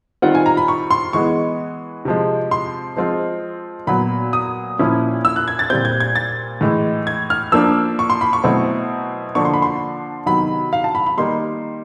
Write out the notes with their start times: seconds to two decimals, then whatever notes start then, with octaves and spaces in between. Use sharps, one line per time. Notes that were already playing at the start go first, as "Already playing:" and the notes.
0.22 D#3 G3 C4 F4 F#5
0.35 G#5
0.46 A#5
0.57 B5
0.68 C#6
0.91 C6
1.13 E3 G#3 B3 C#6
2.05 C3 F3 G#3
2.51 C6
2.97 F3 G#3 C4 F4
3.87 A#2 F#3 B3 B5
4.33 D#6
4.79 A#2 F3 A#3 C#4 E4
5.25 E6
5.36 F#6
5.48 G#6
5.59 A6
5.70 A#2 G3 C4 G6
5.85 G#6
6.00 G#6
6.16 A6
6.61 A2 E3 G#3
7.07 G#6
7.30 F6
7.52 F3 A#3 D4 E6
7.99 C#6
8.10 C6
8.21 B5
8.33 C#6
8.44 B2 F#3 A3 C4 E4
9.35 D3 F3 A#3 D4 C#6
9.45 C6
9.54 B5
9.62 C6
10.26 C3 D#3 F#3 B3 B5
10.73 F5
10.84 A5
10.95 B5
11.06 B5
11.17 D#3 G3 A#3 D#4 C6